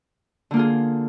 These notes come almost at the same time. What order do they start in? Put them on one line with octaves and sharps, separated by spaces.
D3 A#3 F4 G#4